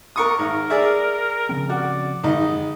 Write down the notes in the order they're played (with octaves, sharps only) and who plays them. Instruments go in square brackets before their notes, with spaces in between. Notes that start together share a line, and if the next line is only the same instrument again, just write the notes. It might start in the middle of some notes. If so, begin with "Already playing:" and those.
[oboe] D4 [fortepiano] A#4 C#6 D#6
[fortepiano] G#1 [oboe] A#4
[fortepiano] G#4 D5 E5
[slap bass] C#3 F3 C4
[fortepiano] F#4 [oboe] D5
[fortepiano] G#1 D#4 [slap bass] F#2 D3 [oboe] D#5